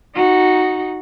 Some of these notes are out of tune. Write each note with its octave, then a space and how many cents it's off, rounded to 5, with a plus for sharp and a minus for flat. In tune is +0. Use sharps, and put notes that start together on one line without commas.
D#4 +0 F#4 +0